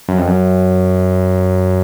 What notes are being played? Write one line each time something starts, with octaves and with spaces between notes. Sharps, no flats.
F#2
F2
F#2